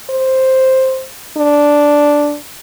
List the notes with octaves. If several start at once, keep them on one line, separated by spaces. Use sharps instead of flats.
C5
D4